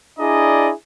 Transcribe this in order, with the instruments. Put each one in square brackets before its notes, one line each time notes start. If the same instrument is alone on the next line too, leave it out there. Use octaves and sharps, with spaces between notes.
[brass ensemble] D4 E4 G#4 D5 D#5 A#5